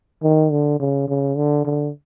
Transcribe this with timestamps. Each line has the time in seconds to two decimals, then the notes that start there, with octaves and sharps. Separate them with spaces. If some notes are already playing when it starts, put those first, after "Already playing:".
0.23 D#3
0.51 D3
0.80 C#3
1.08 C#3
1.36 D3
1.65 D3